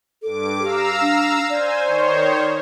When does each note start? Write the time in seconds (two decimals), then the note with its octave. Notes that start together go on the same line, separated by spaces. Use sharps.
0.23 G2 A4 D6
0.62 G4 F5 A#5 E6
1.01 D4
1.50 C5 D5 G#5
1.84 D#3 C5 C#5